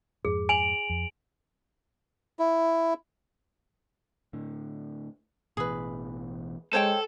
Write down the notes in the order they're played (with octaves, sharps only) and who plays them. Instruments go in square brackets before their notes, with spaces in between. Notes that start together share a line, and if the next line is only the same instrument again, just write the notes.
[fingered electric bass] F2 G#2 [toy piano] G#4
[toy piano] G#5 [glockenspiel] D7 F7 F#7
[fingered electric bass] F2
[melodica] E4
[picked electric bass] A2 D3
[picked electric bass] A1 B2 E3 [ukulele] G#4 B4
[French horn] G#3 [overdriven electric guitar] A4 [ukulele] C5 C#5 G5